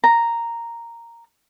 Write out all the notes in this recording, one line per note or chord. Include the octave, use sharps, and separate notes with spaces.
A#5